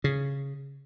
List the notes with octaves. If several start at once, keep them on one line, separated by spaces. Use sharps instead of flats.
C#3